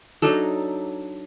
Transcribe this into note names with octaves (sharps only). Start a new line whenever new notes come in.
F#3 D4 D#4 A4